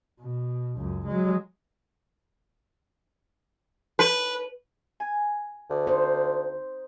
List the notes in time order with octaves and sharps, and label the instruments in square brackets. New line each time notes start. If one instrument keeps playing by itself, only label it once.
[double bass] B2
C#2 F#2
F#3 G#3
[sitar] B4
[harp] G#5
[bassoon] D2
[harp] D#4 [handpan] C5